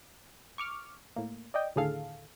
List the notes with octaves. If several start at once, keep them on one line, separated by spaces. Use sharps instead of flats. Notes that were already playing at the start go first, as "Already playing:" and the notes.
C#6 D6 F6
A2 A#3
D5 D#5 G5
D#2 A2 D3 G#4 A4 F5